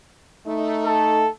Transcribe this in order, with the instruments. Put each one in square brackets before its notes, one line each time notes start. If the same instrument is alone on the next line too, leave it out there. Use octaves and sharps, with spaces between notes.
[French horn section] A3 D#4
[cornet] A4